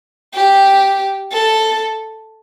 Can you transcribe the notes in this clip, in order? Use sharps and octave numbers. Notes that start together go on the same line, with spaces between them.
G4
A4